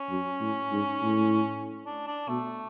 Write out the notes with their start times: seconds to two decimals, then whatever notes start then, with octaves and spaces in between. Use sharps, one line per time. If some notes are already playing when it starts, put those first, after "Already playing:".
Already playing: C#4
0.09 F#2
0.40 A2
0.72 G#2
1.03 A2
1.86 D4
2.07 D4
2.28 B2 A3